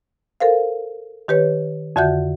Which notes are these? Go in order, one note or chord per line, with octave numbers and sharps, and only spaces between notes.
A4 A#4 C5 F5
D#3 G4 B4 C#5
F2 D3 F#4 E5 F#5 G6